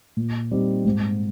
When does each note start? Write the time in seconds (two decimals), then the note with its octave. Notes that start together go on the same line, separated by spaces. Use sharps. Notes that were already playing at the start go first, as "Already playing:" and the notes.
0.17 A#2
0.51 G3 C4 D#4
0.85 G#2